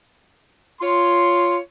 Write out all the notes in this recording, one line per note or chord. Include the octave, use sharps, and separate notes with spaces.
F4 C#5 C6